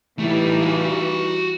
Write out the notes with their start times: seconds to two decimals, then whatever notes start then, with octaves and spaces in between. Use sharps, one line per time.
0.19 E3 G3 A3 D#4 E4
0.62 F#4 F5